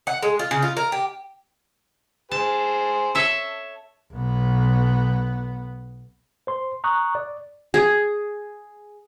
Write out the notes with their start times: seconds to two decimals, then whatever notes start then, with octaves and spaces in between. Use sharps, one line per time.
0.07 F#5
0.22 G#3
0.39 F4
0.51 C#3
0.62 F4
0.77 A#4
0.92 G4
2.31 G#4 C5 A5
3.15 A4 C#5 E5
4.12 B1 B3
6.47 C5 C6
6.84 A#5 C#6 D#6 F#6
7.15 D5
7.74 G#4